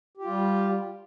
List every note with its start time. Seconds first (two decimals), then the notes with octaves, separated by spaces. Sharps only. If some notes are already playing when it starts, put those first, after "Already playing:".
0.17 G4
0.22 F4
0.27 G3